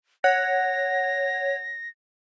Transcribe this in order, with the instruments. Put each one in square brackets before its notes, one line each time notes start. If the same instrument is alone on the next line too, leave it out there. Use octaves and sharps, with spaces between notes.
[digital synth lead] C#5 [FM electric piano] F#5 [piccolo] A#6